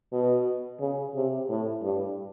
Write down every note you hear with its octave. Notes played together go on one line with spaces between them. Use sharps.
B2
C#3
C3
A2
G2